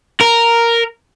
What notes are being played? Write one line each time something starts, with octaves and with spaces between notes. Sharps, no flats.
A#4